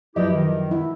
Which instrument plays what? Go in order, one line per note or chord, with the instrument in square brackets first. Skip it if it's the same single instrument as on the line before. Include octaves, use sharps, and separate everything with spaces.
[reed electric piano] F#2 F3 F#3 [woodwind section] E4 G4 [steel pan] B4 D5 D#5
[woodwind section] D#3
[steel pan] E4